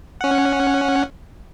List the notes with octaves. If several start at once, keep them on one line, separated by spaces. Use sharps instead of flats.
C#4 F#5